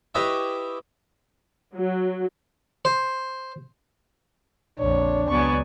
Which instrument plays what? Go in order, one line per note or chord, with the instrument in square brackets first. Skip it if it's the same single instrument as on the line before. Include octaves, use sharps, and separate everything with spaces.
[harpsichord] E4 G4 B4 C#5 D#5 E5
[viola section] F#3
[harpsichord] C5
[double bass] A#1 F2 [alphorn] D4 [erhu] C#5
[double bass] C#2 F#3 [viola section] B3 D5 G#5 [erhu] C#6